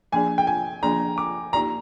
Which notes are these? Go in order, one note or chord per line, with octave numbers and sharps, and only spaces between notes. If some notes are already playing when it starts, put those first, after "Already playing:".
F3 A#3 D4 G#4 D5 G#5
G5
G#5
F3 A#3 D4 G#4 D5 A#5
D6
A#3 D#4 G4 D5 A#5